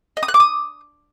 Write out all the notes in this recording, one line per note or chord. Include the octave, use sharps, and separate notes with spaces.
D#5
D#6
F#6
D6
D#6